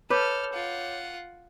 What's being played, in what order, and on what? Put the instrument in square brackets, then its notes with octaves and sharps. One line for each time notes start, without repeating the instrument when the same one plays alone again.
[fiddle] A4 F6 [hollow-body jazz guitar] B4 [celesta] C#5 D6 G6
[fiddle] F4 F#5